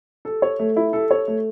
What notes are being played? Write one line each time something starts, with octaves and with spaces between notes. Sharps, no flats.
A4
C#5
A3
E4
A4
C#5
A3